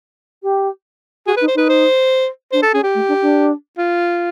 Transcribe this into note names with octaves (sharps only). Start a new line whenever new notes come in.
G4
F#4 G#4
B4
D#4
C5
D#4 B4
C5
D4 C5
A4
C#4 G#4
G4
A3
D4
D4
F4